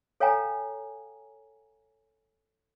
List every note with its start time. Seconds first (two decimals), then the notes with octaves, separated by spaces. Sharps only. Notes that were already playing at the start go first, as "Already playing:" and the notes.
0.20 A4 C#5 F5 G5 G#5 A#5